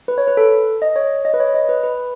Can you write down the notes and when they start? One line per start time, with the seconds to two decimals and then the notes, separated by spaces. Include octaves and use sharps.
0.08 B4
0.18 C#5
0.28 B4
0.37 A4
0.82 D#5
0.96 C#5
1.25 D#5
1.34 B4
1.40 C#5
1.54 D#5
1.69 B4
1.83 B4